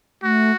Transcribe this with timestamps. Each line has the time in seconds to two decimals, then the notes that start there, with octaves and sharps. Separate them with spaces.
0.23 A3 F#4